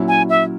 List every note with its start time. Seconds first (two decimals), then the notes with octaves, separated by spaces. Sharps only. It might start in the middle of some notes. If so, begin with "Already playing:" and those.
Already playing: A#2 F#3 C#4 E4
0.08 G#5
0.29 E5